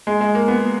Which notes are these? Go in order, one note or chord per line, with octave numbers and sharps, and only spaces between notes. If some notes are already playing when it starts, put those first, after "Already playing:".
G#3
G#3
A#3
B3